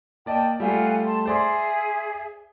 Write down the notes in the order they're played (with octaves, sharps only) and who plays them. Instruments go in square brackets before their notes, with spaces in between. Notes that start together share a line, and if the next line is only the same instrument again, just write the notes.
[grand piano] A#3 D5 D#5 [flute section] G5 A5
[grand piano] G3 A3 [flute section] F4 F#5 G#5
[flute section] A5 C6
[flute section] G#4 E5 [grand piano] C5 D5 C6